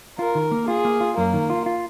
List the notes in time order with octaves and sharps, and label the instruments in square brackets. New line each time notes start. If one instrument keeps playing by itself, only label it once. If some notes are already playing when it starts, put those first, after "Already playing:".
[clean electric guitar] F4 [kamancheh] A#4
[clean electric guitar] D#3
A#3
[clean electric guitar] F4 [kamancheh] G#4
[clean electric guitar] A#3
F4
[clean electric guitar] F#2 [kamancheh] A#3
[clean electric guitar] D#3
F4
F4